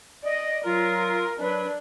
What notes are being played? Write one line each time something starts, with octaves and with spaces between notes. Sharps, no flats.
D5 D#5
F#3 F4 A#4
F#3 D4 B4